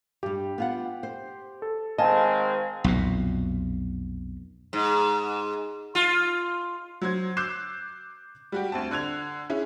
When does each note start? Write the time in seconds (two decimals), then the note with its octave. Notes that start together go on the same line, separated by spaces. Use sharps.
0.23 G2 G3 G4
0.58 B3 F4 F#5
1.03 C5
1.62 A4
1.98 D#3 G#3 C4 D#5 F5 G#5 A5
2.84 B1 F2 A#2
4.73 G#2
5.95 F4
7.02 F#3 C5 G#6
7.37 D6 E6 F#6 G6 C7 E7
8.52 G3 F#4 G4
8.72 D2 C4 A5
8.91 D3 F#6 G#6 F7
9.50 C#4 E4 G#4